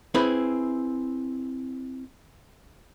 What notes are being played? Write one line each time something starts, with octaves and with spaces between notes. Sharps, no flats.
C4 E4 G#4 B4